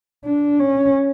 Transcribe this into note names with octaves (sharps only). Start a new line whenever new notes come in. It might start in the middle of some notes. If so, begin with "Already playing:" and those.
D4
C#4